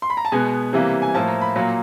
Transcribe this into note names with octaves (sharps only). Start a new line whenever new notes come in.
C6
B5
A#5
A5
B2 G#3 B3 G#5
C3 E3 G3 A#3
G#5
A2 F3 A#3 A5
A#5
B5
A#2 F#3 A#3